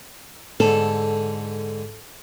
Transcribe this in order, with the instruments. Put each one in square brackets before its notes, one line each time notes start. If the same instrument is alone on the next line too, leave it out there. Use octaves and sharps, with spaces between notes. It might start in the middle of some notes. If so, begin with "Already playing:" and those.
[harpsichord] G#2 D3 [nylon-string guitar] A4